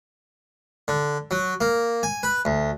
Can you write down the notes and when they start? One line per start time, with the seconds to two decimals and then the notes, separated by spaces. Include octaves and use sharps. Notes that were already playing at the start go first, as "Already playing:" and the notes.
0.88 D3
1.31 F#3
1.61 A#3
2.03 G#5
2.23 B4
2.45 D2